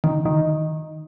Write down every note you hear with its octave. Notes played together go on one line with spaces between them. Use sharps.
D#3
D#3